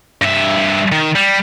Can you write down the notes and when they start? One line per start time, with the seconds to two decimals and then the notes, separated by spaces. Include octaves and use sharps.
0.22 G2 E5
0.92 D#3
1.16 G3